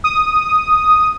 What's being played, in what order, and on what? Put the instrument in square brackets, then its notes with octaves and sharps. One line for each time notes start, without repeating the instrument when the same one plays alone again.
[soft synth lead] D#6